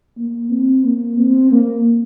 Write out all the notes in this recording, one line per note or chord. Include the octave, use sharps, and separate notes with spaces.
A#3
C4
A#3
C4
A#3